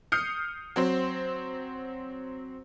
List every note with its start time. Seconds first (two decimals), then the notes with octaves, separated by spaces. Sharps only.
0.12 D#6 F6 G6 C7 C#7
0.76 F#3 C4 C5